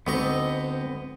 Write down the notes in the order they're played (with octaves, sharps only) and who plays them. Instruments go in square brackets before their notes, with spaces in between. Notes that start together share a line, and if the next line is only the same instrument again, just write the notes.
[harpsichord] D2 D#4 C#6 [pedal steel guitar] B3 C4 D#5